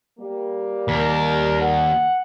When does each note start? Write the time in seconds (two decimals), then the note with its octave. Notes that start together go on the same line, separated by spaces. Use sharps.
0.19 G3 A#3
0.89 D#2 A#4
1.60 F#5